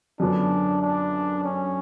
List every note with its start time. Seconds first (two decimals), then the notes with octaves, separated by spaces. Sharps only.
0.20 F#2 D3 F#3 B3 D4
0.82 D4
1.44 C#4